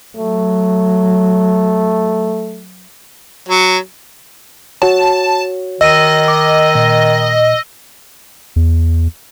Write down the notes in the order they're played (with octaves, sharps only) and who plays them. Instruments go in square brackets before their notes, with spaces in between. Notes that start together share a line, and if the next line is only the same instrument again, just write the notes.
[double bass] F#3 [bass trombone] A3
[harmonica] F#3
[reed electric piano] F#4 C#5 [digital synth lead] A5
[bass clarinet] D#3 [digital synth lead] D#5 [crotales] E6 A#6 D#7
[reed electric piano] D6
A#2
[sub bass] E2